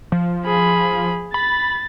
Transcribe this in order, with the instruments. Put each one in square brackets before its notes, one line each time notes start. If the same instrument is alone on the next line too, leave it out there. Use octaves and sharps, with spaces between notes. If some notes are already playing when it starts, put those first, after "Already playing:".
[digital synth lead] F3
[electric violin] G#4 B5
[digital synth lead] B5 [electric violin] A6